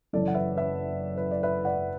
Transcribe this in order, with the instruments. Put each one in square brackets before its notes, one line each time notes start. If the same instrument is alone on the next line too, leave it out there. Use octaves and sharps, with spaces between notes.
[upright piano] F#1 F#2 E3 A4 D5
F#5
B4 E5
B4 E5
B4
D5
B4 E5
D5 F#5